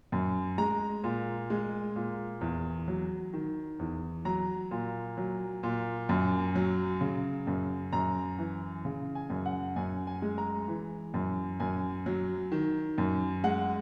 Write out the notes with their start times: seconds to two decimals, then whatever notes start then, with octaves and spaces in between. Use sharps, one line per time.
0.12 F#2
0.58 G#3 A#5
1.04 A#2
1.50 G#3
1.96 A#2
2.41 E2
2.88 F#3
3.33 D#3
3.79 E2
4.25 F#3 A#5
4.71 A#2
5.17 F#3
5.63 A#2
6.09 F#2
6.55 F#3
7.01 C#3
7.47 F#2
7.93 F#2 A#5
8.39 E3
8.85 C#3
9.15 G#5
9.30 F#2
9.46 F#5
9.76 F#2 G#5
10.07 G#5
10.22 G#3
10.38 A#5
10.68 E3
11.14 F#2
11.60 F#2 G#5
12.06 F#3
12.52 D#3
12.98 F#2
13.44 G#3 F#5